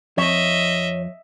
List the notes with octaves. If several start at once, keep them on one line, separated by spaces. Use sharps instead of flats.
F2 C#5 D#5 E5